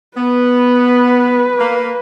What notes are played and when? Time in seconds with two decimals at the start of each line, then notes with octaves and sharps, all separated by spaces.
0.17 B3 B4
1.58 A#3